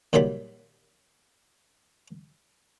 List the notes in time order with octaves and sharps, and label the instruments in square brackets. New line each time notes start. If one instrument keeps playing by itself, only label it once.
[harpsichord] A#2 D#3 F#3 G3 B5